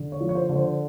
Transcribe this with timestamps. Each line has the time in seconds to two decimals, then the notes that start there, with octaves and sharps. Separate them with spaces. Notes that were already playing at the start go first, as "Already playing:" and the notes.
Already playing: D3
0.12 C#5
0.21 F3
0.29 C#5
0.35 C5
0.49 D3
0.56 C5